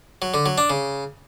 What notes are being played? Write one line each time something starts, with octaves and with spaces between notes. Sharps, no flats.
F#3
D3
F#3
D4
C#3